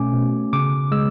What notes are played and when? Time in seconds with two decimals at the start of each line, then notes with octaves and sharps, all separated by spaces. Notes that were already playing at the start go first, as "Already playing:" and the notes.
Already playing: B2 A3 C#4 G#5 D6
0.13 B2
0.53 C#3 D6
0.91 G#3 E6